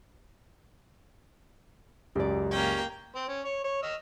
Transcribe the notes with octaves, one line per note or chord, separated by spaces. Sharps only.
C#2 F#2 G4 D5
A#3 C#4 G5
C4 C5
C#4
C#5
C#5
D#5 E6 F6